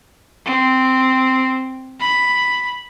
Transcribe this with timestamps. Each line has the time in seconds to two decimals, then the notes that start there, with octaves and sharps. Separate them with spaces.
0.46 C4
2.00 B5